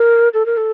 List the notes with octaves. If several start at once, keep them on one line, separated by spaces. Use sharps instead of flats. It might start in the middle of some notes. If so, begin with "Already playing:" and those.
Already playing: A#4
A4
A#4
A4